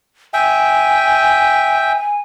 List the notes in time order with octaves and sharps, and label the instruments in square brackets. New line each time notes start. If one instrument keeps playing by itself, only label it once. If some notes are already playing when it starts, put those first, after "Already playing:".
[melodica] E5 G5 [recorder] G#5